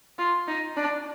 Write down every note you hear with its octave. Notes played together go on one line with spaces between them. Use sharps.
F4
D#4
D4